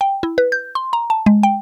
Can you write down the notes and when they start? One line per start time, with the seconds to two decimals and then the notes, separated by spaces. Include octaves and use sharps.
0.01 G5
0.23 E4
0.38 B4
0.52 G6
0.75 C6
0.93 A#5
1.10 A5
1.26 G#3
1.43 G5